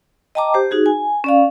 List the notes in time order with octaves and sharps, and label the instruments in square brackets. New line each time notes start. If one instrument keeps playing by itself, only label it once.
[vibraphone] D#5 G5 A5 A#5 D6
G4 C5
D#4 F#4 G#4
G#5
C#4 D5 F5